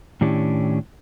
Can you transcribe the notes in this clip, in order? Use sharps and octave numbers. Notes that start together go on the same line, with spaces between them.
A2 D#3 C#4 D4 E4 G4